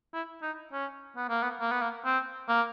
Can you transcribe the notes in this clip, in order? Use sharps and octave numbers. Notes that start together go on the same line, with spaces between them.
E4
D#4
C#4
B3
A#3
B3
A#3
B3
A#3
C4
A#3